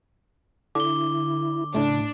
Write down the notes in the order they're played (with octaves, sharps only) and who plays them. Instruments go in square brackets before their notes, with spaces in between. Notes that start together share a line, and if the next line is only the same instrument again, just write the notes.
[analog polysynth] D3 [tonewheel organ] E4 [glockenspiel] D6 G7
[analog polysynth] A2 A3 [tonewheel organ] C#3 [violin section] D4